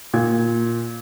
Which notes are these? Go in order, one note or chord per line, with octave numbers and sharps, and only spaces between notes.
A#2 G#6